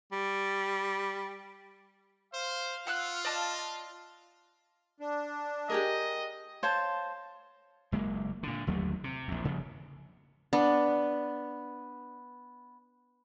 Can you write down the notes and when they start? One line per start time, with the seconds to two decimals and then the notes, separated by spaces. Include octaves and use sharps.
0.12 G3
2.33 C5 F5
2.87 F4 F#5 E6 F#6
3.25 D5 D#5 A5
5.00 D4
5.70 G4 G#4 A#4 D#5
6.63 C5 C#5 F5 A5
7.92 F#1 G#3 A#3
8.43 A#2 D3
8.67 G1 D#2 F#3 A3
9.04 C3
9.28 A#1 E2
9.44 G1 C#3 F3
10.53 B3 D4